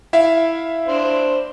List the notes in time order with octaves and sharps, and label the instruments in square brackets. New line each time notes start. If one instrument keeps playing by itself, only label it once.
[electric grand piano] E4 E5 F5
[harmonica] D4 C5